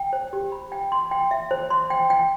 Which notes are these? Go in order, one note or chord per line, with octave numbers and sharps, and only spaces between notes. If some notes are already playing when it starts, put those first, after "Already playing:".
Already playing: G5
C5
G4
B5
G5
C6
G5
E5
C5
C6
G5
G5